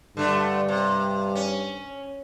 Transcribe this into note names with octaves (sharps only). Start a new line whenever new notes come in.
G2 D3 A3
C3
C#4